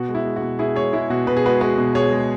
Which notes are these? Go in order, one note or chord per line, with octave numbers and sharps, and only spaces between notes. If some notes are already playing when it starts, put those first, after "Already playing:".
Already playing: B2 F#4
G#3
E4
G#3
F#4
B2
B2 E4 G#4
G#3 G#4 C#5
G#3 E4
B2 F#4
B2 B4
G#4
G#3 F#4 B4
G#3 F#4 B4
B2
B2 G#4 C#5
G#3